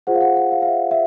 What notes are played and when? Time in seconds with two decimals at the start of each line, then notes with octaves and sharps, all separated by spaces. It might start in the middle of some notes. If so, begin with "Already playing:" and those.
0.07 F4 G#4 C5 F#5
0.15 F5
0.21 F#5
0.36 F#5
0.52 F5
0.62 F5
0.67 E5
0.91 E5